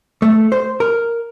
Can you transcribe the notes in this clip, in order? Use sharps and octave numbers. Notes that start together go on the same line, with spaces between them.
A3
C5
A#4